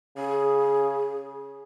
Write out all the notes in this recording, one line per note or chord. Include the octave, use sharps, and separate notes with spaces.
C#3 G#4